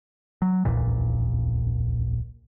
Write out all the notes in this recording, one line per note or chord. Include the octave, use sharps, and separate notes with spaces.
F#3
D1 A#1 E2 A#2